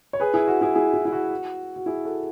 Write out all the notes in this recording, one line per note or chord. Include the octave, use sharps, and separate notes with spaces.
C#5
G#4 B4
E4 G#4
F#4
E4 G#4
E4 G#4
E4
E4
F#4
F#4
E4 G#4
F#4 A4